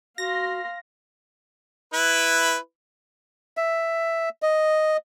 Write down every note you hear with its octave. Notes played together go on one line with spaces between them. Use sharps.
F#4 F5 C6 A#6
E4 B4
E5
D#5